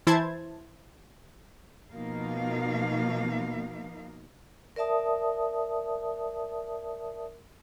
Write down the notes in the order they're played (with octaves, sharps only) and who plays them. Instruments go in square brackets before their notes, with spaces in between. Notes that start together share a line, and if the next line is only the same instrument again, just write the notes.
[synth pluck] E3 E4 C5 A5 G#6
[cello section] B2 F3 A#3 D#4 F5
[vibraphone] A#4 D5 E5 A5 D#6